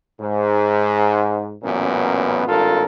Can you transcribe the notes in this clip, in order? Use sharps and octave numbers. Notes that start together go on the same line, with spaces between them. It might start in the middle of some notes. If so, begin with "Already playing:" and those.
G#2
A1 F#2 A#2 B3
G#1 G2 F4 A4 A#4